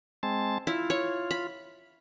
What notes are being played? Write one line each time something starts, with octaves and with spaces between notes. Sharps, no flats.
G#3 C4 A5
E4 F4
C#5
B5